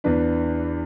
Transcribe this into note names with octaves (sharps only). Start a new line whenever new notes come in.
E2 E3 D4 B4